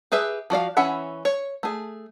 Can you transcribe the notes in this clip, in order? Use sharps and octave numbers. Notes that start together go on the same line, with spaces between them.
G4 G#4 B4 E5
F3 F#4 D5 F5
E3 C#4 E5 F#5 B5
C#5
A3 G#4